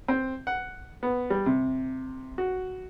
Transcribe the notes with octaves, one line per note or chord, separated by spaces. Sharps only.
C4
F#5
B3
G3
C3
F#4